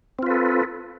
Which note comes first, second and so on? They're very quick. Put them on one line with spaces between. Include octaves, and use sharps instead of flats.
C4 F4 B4 A4